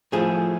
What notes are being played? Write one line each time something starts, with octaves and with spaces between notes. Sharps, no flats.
A2 F3 A3 G#4